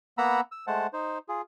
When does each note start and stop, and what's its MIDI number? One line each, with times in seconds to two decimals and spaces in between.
0.18 0.41 58
0.18 0.41 59
0.18 0.41 78
0.18 0.41 82
0.18 0.41 83
0.18 0.41 88
0.52 0.66 88
0.67 0.87 56
0.67 0.87 57
0.67 0.87 72
0.67 0.87 78
0.67 0.87 81
0.93 1.18 63
0.93 1.18 72
1.29 1.42 65
1.29 1.42 68